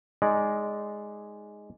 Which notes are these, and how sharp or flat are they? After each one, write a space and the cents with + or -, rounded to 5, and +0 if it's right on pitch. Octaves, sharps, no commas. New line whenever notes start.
G#3 +0 D#4 +0 D5 -10